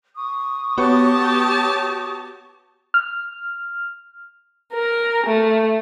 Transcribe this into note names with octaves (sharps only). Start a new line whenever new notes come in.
C#6 D#6
B3 F#4 G4 C#5 A5
F6
A#4
A3